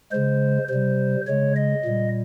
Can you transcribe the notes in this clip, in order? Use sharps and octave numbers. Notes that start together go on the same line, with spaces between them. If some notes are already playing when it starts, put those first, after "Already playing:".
C#3 G#3 C5
C3 G3 C5
C#3 G#3 C#5
D#5
A#2 G3